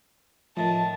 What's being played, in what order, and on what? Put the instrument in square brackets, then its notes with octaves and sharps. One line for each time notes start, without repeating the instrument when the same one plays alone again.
[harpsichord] A2 D#3 [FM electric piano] F3 [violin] A5